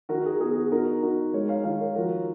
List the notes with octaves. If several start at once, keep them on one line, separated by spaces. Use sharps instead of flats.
D#3 F#4 A#4
G#4
B3 G#4
G#4
D#4 F#4 A#4
D#4 F#4 A#4
G#3 A#4 C#5
C#5 F5
D#3 C#5 F5
A#4 C#5
F3 F#4 A#4